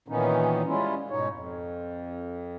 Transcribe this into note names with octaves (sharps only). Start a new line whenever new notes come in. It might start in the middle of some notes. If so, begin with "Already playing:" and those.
A#2 D#3 E3 B3 C#4 D#4
G3 G#3 C#4 E4 F4
G#2 B2 D#4 C#5
F2